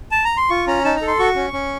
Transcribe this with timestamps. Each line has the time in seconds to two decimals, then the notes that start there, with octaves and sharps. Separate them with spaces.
0.11 A5
0.24 A#5
0.37 C6
0.50 F4 C#6
0.67 C#4 A#5
0.85 D#4 A5
0.96 A#5
1.02 A4
1.08 C6
1.19 F#4 C#6
1.36 C#4
1.53 C#4